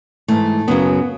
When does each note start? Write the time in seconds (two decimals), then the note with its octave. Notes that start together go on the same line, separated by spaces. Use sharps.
0.28 G#2 E3 A3
0.68 F#2 C#3 F#3 B3